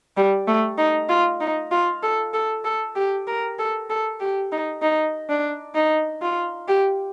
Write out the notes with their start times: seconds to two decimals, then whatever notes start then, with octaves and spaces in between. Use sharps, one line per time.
0.17 G3
0.47 A3
0.78 D#4
1.09 F4
1.40 D#4
1.71 F4
2.03 A4
2.34 A4
2.65 A4
2.95 G4
3.27 A#4
3.58 A4
3.90 A4
4.21 G4
4.52 D#4
4.82 D#4
5.29 D4
5.75 D#4
6.22 F4
6.68 G4